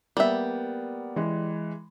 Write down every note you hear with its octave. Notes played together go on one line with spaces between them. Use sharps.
G3 A#3 B3 E5
E3 G#3